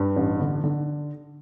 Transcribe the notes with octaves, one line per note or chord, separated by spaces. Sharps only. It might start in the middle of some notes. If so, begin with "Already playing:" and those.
Already playing: G2
A1
D3
D3